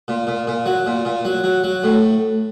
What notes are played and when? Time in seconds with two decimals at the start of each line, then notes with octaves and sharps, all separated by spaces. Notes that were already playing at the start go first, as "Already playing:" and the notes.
0.08 A#2
0.27 A#2
0.47 A#2
0.66 F#3
0.86 A#2
1.05 A#2
1.25 F#3
1.44 F#3
1.64 F#3
1.84 A2